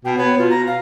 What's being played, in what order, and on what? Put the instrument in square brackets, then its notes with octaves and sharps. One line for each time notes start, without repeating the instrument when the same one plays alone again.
[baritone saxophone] B2 [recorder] G5
[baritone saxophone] B3 [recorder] C#5
[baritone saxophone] B2 [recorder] F4
[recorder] A#5
F5